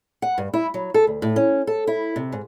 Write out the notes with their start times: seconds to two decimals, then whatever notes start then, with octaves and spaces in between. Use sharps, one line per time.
0.22 F#5
0.38 G2
0.54 E4
0.74 F#3
0.94 A4
1.07 D2
1.22 A2
1.36 C#4
1.67 A4
1.87 E4
2.16 C3
2.32 G#2